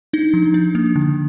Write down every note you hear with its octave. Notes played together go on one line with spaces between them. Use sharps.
D4 D#4
F3
D4
A#3
D3